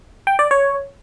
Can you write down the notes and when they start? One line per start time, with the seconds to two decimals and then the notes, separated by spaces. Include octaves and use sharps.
0.27 G5
0.39 D5
0.51 C#5